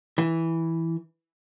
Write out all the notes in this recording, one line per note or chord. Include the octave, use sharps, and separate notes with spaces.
E3